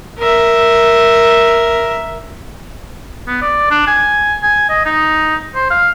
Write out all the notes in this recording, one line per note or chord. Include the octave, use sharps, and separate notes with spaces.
A#4 E5
B3
D5
D4
G#5
G#5
D#5
D#4
C5
F5